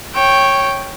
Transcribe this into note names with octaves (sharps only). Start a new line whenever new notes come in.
C#5 G5